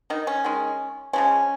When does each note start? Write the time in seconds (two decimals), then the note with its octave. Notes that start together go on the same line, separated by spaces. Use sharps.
0.10 D#3 D#4
0.27 C#4
0.44 D#3 G#3
1.13 C#3 F3 G#3 C#4